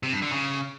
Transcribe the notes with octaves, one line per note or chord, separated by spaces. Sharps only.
C3
G2
D3
C#3